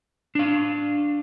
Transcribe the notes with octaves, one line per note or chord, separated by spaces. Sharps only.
D4 F5